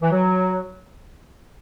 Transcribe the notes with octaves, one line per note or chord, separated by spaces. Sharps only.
E3
F#3